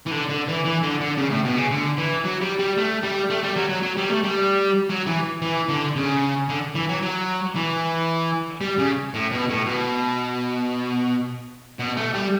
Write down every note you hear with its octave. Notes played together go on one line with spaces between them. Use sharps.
E3
D3
D3
E3
E3
D3
D3
C#3
A2
B2
C#3
D3
E3
F#3
G3
G3
A3
G3
A3
G3
F#3
F#3
F#3
G3
A3
G3
F#3
E3
E3
D3
C#3
D3
E3
F#3
F#3
E3
G3
C#3
A2
B2
A2
B2
B2
A3
G3